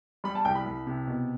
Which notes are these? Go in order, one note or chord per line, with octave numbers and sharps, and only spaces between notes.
G3 B5
A5
C2 G5
B5
C2
C3
B2